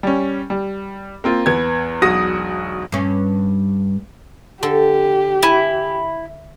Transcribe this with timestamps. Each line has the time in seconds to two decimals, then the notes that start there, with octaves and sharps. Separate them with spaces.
0.03 G3 C#4
0.50 G3
1.24 A#3 C4 F4
1.46 E2 B3 G#6
2.02 E1 B1 F#4 D#6 A#6
2.92 G2 C#4
4.63 D3 G4 A4
5.43 E4 G#5